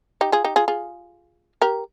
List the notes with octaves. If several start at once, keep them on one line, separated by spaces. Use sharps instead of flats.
D#4 G4
F4 G#4
D#4 G4
F4 G#4
F4 G#4
G4 A#4